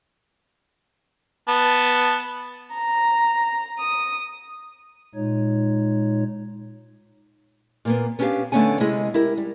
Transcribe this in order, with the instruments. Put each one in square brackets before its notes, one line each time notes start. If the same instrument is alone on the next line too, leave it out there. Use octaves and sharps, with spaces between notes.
[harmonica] B3 A5
[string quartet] A#5
D#6
[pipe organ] A#2 G#3 D#4 C#5
[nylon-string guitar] A#2 A#3 B3
B3 C#4 D4 F#4 G4 F5
D3 A3 B3 C#4 F#5 G#5
C3 G#3 C#4 E4 G#4 D#5
E4 G4 A#4
G3